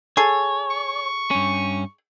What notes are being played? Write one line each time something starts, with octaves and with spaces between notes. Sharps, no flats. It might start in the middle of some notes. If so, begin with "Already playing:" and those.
G#4 A4 C#5
C#6
G2 C#4